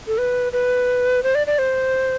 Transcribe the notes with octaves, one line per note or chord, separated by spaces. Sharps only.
A4
B4
B4
C5
D5
D5
C5